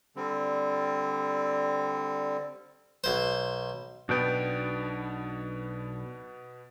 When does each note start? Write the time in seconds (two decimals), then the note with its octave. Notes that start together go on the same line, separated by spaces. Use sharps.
0.16 D3 G3 C4
3.04 B1 C5
4.09 B1 B2 B3 D4 G5